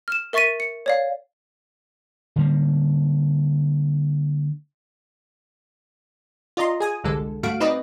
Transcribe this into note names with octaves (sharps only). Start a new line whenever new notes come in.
F6 E7
A#4 E5 C#6 A6 B6 D#7
C#7
C#5 D5 F5
D3 G3 A#3
F4 D5 D#5 A#5 C6
G#4 G#5 D#6
G1 C2 D3 G#3 A4
G2 A3 F#4 F5 D7
C4 D#4 B4 D5 D#5